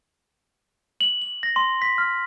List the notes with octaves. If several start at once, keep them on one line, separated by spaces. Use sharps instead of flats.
F#7
F#7
A#6
C6
B6
F6